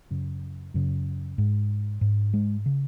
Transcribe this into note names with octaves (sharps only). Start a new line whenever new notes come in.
F#2 C#3
F#2 C#3
G#2
G#2
G#3
C#3